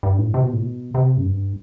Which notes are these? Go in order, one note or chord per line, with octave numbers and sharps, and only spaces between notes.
G2
A2
C3
B2
A2
B2
C3
F#2
G2